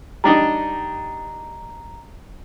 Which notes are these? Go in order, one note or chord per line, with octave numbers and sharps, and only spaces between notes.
G3 D4 D#4 A#5